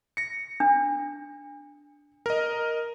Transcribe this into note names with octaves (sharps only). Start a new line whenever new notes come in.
A#6 C#7
D4
A#4 D#5